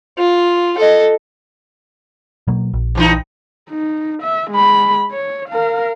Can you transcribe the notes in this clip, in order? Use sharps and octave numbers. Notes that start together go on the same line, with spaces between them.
F4
A4 D#5
B2 F#3 A#3
A#1
G2 E3 D#4
D#4
E5
G#3 B5
C#5
A#4 F5